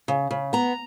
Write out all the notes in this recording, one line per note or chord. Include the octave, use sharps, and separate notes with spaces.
C#3
C#3
B3 A#5